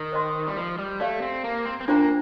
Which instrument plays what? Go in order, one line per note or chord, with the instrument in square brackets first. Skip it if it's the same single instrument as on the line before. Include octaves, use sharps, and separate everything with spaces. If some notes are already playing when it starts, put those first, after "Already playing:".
Already playing: [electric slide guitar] D#3
[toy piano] C5 D#5 G5 C6
[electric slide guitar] G3
F3
G3
[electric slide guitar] A3 [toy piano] G4 D5 F5
[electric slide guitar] C4
A#3
C4
C4
[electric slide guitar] A#3 [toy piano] D4 F4 C5 G5 A#5